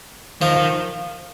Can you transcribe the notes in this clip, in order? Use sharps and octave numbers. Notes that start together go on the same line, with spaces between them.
D#3 F3
D#3